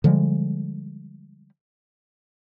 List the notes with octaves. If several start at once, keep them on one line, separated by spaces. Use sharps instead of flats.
D3 F3 G3 G#3